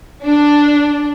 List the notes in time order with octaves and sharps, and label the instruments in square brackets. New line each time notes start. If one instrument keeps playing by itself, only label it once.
[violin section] D4